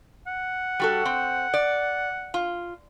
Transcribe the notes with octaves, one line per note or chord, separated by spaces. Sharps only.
F#5
G3 F#4 A4
C4
D5
F4